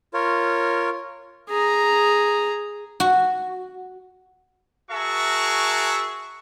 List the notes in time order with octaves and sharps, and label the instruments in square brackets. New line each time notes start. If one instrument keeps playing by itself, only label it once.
[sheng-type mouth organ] F4 A#4 C#5
[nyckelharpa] G#4 A#5
[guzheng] F#4
[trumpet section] F#4 G#4 A#4 E5 A5 C#6